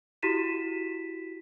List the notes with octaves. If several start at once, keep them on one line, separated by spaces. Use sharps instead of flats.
E4 F#4 G4 B6 D#7 E7